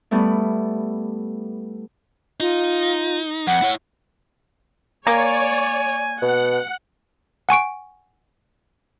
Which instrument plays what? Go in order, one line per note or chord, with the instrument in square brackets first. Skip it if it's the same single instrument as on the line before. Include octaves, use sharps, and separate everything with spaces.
[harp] G3 A3 B3 E4
[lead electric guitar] D#4 [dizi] F4
[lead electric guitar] F2 [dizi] F#5
[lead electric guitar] E4 C#5
[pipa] A#3 [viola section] C#5 D5 [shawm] G#5
[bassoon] B2 [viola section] F#5
[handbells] F#5 G#5 C#6 D7